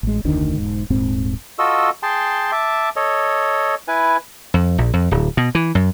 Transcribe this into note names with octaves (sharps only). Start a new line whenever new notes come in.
A1 G#3
F1 D2 D#3 D4
E1 G#2
D#1 G#2 C4
F4 F#4 A4 D#5 E6
G#4 G5 A5 C6
E5 A5 D6
A4 C#5 D#5
E4 B4 G#5
F2
A#1
F2
D1
B2
E3
F#2